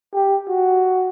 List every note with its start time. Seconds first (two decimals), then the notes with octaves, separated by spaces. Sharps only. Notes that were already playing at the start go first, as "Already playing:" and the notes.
0.14 G4
0.49 F#4